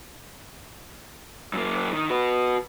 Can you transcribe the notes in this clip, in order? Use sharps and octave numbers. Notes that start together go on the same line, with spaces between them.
F#2 A#3
D#3
F#4 B4